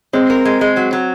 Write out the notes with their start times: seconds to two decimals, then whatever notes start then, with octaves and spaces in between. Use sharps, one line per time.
0.13 G#3 C4
0.30 A#4
0.45 G#3
0.61 G#3
0.76 F#3
0.93 F#3